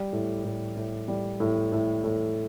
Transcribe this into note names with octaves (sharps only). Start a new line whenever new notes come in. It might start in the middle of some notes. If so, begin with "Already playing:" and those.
Already playing: G3
A2
A2
A2
G3
A2
A2
A2